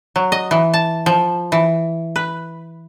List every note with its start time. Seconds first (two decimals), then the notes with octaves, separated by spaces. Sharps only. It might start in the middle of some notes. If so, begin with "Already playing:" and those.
0.16 F#3
0.32 D#5
0.51 E3
0.74 A5
1.06 F3
1.52 E3
2.16 B4